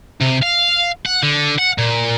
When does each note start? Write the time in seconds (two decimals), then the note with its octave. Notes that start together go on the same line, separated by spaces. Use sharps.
0.21 C3
0.42 F5
1.06 F#5
1.23 D3
1.58 F#5
1.78 A#2